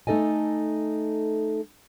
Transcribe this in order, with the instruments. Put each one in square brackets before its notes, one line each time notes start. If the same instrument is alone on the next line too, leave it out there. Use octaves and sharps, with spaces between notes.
[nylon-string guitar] A3 D#4 A4 D#5 G#5